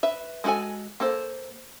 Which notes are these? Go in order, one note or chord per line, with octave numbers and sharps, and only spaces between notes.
B4 E5
G#3 E4 F#4 A4 G#5
A#3 A4 C5